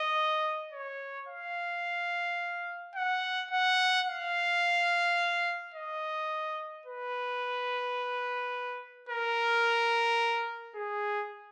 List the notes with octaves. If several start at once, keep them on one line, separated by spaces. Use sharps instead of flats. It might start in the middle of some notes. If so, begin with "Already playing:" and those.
Already playing: D#5
C#5
F5
F#5
F#5
F5
D#5
B4
A#4
G#4